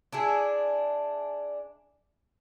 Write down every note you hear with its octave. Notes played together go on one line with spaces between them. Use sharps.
D4 E4 G#4